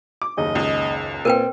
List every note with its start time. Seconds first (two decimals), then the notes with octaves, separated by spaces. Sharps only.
0.22 D6
0.37 F#1 D#2 D#4 D#5
0.55 C#2
1.25 A#2 C4 A#4 B4 G5